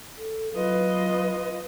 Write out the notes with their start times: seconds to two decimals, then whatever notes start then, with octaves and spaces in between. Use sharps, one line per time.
0.17 A4
0.55 F#3 F4 B4 D#5